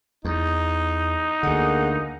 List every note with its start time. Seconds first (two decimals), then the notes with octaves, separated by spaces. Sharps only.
0.25 E2 D#4
1.43 D2 D3 A#3 G#4 F#5